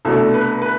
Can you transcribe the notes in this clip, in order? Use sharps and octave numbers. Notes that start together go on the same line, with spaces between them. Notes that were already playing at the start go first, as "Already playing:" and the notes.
C2 B2 A3 D4 A4
B4
B4